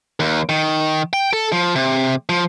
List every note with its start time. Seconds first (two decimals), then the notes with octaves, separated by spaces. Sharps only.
0.20 D#2
0.49 D#3
1.13 G5
1.33 A4
1.52 F3
1.76 C3
2.29 F3